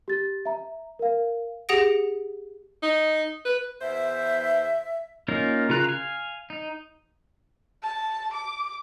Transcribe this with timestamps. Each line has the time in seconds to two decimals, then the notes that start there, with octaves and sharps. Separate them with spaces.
0.08 G4 A6
0.45 E5 A#5
0.99 A#4 F5
1.69 G4 G#4 F#5 D#6 A#6 D7
2.83 D#4
3.45 B4
3.81 E2 C5 E5
5.28 A#3 C#4 D#4 F4 A#4
5.69 C#3 F4 A#4 A#5 F#6
5.84 F5 G#5
6.50 D#4
7.83 A5
8.33 D6